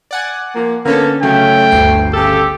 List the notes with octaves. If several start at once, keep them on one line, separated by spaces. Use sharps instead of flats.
D5 F#5 G#5
F3 A#3
D3 A#3 B3 C#4 A4
C#3 F#3 A3 C#4 G5
G1 D2 C7
C#3 G4 A4